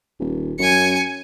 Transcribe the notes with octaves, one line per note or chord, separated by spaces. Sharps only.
D#1
F#2 G#5 C#7